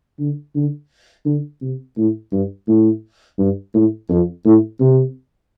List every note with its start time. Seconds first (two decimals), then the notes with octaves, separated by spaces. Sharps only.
0.19 D3
0.55 D3
1.25 D3
1.61 C3
1.97 A2
2.32 G2
2.68 A2
3.39 G2
3.74 A2
4.09 F2
4.45 A2
4.80 C3